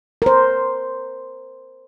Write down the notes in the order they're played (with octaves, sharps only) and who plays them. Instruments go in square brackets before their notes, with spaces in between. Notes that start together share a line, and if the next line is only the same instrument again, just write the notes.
[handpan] A#4 C5